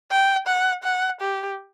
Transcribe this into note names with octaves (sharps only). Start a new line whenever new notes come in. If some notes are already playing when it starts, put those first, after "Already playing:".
G5
F#5
F#5
G4